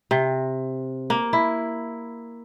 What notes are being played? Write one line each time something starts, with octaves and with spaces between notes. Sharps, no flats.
C3
A#3
E4